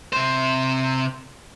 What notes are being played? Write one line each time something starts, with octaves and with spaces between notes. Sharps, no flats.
C3 C5